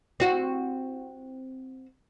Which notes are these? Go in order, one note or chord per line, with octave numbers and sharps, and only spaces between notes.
C4 F#4